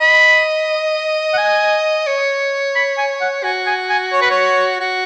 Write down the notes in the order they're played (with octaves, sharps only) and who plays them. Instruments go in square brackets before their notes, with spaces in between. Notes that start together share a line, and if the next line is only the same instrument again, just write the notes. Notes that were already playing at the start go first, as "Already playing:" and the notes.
[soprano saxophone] D#5 [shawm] B5
[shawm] F#5
G#5
[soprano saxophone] C#5
[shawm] B5
G#5
F#5
[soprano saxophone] F#4 [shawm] G#5
[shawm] G#5
G#5
C#5
B4
C#5
[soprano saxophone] F#4